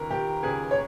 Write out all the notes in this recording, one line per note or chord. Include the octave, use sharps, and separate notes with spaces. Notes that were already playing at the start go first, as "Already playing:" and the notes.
Already playing: C#2 D#3 A#4
D#3 G4
C#2 G#4
C#5